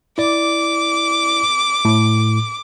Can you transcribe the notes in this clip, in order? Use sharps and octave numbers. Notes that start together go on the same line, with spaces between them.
E4 D5 D6
A2